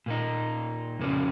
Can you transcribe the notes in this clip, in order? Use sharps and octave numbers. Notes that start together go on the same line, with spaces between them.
A#2 A#3 D#4
F2 C#3 A#3 C#4